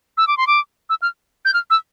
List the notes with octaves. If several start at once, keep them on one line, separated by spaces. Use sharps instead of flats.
E6
D6
C6
D6
E6
F6
G6
F6
E6